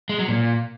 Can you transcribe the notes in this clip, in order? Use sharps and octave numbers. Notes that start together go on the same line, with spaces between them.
G#3
F#3
A#2